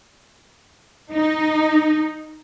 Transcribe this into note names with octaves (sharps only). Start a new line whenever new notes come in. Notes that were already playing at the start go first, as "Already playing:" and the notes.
D#4